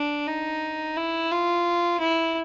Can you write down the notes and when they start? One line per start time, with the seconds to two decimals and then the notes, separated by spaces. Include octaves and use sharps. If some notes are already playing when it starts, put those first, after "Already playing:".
Already playing: D4
0.27 D#4
0.97 E4
1.32 F4
2.00 E4